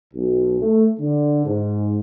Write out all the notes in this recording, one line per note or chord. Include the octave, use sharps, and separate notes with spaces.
B1
A3
D3
G#2